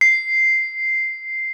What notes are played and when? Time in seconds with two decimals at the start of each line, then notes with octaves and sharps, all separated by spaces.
0.01 C7